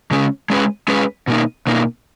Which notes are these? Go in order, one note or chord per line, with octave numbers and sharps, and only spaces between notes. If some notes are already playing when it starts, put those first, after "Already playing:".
C#3 G#3 C#4 G#4
G#3 C#4 G#4 B4
G#3 C#4 G#4 B4
B2 A#3 D#4
B2 A#3 D#4